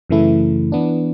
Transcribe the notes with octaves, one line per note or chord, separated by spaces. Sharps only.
F#2 C#3 E3 A3 E4
E3 B3 D4